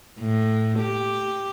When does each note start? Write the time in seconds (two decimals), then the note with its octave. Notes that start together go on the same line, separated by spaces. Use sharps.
0.20 A2
0.79 G4